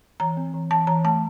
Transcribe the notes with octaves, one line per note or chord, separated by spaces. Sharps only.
E3 A#5
C4
E3
E3 A5
E3 A#5
A3 A5